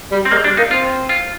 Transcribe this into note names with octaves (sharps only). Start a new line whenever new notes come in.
G3
C4
G#3 A#3
G3 D4
A#3 D#4
C4 F4
F4